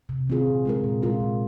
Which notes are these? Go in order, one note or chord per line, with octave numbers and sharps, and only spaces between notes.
C3
D#3 C4 F4 G#4
A#2
G#3 F4 A#4
A#2
G#3 F4 A#4
A#2